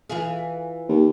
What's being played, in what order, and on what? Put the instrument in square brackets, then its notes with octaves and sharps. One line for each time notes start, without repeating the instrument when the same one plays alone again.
[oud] E3 F4 G#4
[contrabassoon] D#2